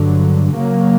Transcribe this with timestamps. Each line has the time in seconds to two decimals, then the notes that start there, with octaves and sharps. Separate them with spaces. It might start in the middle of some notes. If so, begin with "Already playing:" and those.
Already playing: G2 D3 F#3
0.54 C#3 F#3 A#3